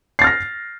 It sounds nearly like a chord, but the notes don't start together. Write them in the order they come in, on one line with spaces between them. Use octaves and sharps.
C7 A6 F6 A#6